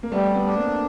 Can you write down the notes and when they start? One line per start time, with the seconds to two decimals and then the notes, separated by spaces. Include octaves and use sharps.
0.03 A#3
0.12 G3 A3 B3
0.35 A3 B3
0.46 D4
0.57 A#3 C4